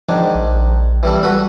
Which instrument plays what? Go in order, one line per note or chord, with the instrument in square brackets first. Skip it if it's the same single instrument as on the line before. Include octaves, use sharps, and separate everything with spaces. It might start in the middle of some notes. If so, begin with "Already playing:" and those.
[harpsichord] G#2 D#3 D4 [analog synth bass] F3
[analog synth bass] A#1
[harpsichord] E3 G3 A4
[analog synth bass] G3 [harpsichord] F#4 A4 B4